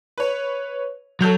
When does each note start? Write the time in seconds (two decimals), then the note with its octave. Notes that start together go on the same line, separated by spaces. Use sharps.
0.18 B4 C#5
1.21 F#3 A4 G6 F7